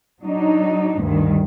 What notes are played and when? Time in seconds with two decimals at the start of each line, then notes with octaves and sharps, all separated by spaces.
0.21 F#3 D4 D#4
1.01 D2 G2 D#3